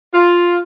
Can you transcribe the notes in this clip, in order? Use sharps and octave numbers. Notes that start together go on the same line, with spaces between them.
F4